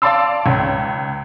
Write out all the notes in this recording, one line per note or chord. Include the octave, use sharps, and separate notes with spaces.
D5 F5 A5 C6 E6
C#2 C#4